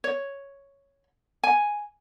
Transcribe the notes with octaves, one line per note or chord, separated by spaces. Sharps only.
C#5
G#5